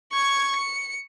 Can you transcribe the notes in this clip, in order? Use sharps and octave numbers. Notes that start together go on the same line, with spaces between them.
C#6 G#6
C#7